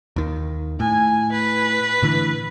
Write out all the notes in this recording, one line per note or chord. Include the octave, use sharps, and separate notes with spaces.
D#2 D#3
A2 G#5
B4
A2 D3 E3